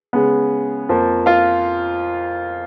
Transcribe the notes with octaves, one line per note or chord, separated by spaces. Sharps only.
C#3 G#3 B3
F2 F3 A#3
F4 F5